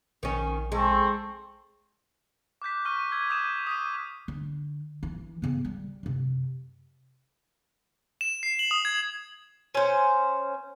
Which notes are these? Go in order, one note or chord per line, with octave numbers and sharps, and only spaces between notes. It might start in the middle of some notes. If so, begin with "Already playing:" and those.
A#1 D#3 C#4
G#3 C4 A4 C#6
D6 F#6 G6 B6
C#6 F6 B6 D#7
E6 G#6 B6
D#6 G6 B6 D#7 E7
D#6 B6 D#7
D3
E3
C#3 B3
G3
F#2 C3
E7
C7
F#7
D#6
G#6
C#4 C5